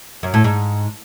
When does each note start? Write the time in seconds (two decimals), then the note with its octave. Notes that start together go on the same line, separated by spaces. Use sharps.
0.23 F#2
0.34 A2
0.44 G#2